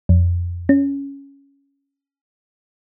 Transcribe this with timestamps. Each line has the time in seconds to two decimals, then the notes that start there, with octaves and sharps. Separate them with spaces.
0.09 F2
0.69 C#4